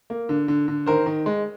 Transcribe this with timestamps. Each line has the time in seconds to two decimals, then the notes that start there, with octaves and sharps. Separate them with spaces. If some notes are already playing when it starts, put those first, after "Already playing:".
0.10 A#3
0.29 D3
0.48 D3
0.68 D3
0.86 D#3 A#4 C5
1.06 D#3
1.26 G#3